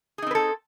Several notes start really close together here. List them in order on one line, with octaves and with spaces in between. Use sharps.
G#4 D#4 C4 B4 A4